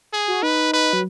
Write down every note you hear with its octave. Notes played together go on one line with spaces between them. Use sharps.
G#4
F#4
D#4 B4
B4
F#3